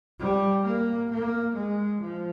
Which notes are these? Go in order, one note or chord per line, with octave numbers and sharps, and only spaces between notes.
G3
A#3
A#3
G#3
F3